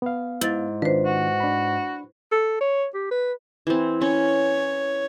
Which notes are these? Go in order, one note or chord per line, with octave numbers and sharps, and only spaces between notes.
B3 F5
G#2 E4 A6
D#3 D4 F4 B4 C5
F#4
D4 B5
A4
C#5
G4
B4
E3 C4
C#4 C#5